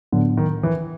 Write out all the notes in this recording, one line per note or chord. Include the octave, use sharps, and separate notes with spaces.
A2 D3 F#3 B3
D#3
E3